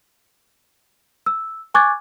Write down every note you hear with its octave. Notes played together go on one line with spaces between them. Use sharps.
E6
G#5 C#6 D6 F#6 G#6 A6